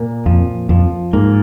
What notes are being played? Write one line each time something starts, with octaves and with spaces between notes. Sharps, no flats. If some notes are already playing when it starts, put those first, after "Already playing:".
Already playing: A#2 A#3
F2 F3
F2 F3
G#2 A#3